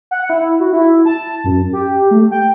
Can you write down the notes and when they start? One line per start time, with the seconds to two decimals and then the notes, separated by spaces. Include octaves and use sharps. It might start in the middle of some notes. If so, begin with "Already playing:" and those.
0.11 F#5
0.30 E4
0.60 F#4
0.73 E4
1.05 A5
1.44 F#2
1.73 G4
2.11 A3
2.31 G5